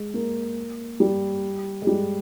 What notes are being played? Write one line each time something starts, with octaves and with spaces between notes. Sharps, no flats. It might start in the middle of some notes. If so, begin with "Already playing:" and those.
Already playing: G#3
A#3
G3
G#3
G3